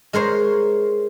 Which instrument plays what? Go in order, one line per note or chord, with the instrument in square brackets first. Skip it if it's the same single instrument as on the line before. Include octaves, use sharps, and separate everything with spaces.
[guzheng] G#3 A#4 C5 C#5